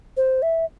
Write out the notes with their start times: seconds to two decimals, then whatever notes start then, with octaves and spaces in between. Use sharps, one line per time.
0.17 C5
0.42 E5